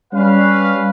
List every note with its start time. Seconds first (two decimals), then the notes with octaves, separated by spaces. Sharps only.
0.13 G3 C#4 B4 F5